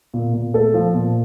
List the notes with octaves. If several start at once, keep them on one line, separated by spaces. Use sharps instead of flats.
A#2
A#2
A3 A4
F3
A#2